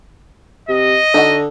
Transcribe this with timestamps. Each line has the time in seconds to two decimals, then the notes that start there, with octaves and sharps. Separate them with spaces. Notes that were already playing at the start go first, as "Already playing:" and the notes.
0.69 C3 D#5
1.14 D3 D#4 F#4